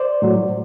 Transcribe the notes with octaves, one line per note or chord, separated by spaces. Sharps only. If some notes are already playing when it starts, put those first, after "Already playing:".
Already playing: C5 D5
A2 F#3